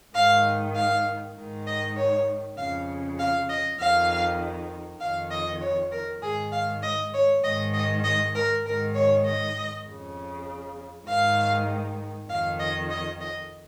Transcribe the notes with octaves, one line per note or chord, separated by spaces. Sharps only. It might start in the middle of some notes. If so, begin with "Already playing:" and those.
G#2 D#3 F5
F5
G#2 D#3
D#5
C#5
F2 C#3 F5
F5
D#5
F2 D#3 F5
F2 D#3 F5
D#5
C#5
A#4
G#2 D#3 G#4
F5
D#5
C#5
G#2 D#3 D#5
D#5
D#5
A#4
G#2 D#3 A#4
C#5
D#5
F2 C#3
G#2 D#3 F5
F2 D#3 F5
D#5
D#5
D#5